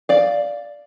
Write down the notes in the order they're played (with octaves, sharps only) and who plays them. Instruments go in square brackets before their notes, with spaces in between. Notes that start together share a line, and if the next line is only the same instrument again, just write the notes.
[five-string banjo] D5 F5